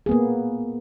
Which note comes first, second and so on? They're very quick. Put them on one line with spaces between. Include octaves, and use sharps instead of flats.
G#4 B3 A#3